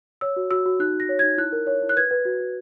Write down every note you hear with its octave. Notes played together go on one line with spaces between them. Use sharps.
C#5 E6
F#4
F#4 E6
F#4
D#4 F#6
D#4
A#6
C#5
G#6
D#4
E4 F#6
A#4
C#5
E4
F#6
B4 G#6
B4
F#4
F#4